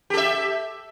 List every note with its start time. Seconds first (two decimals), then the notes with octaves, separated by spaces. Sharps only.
0.10 G4
0.14 A4
0.17 E5